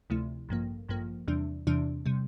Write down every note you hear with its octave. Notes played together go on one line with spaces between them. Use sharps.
D2 C3 F3 A3 E4
A1 G2 F3 A#3
A1 G2 F3 A#3
E2 C3 E3 G3 D4
E2 C3 E3 G3 D4
C3 G3